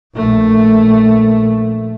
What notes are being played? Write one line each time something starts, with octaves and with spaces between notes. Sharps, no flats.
A#1 A3